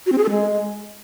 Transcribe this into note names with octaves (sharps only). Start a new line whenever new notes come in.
F#4
C4
G#4
A4
G#3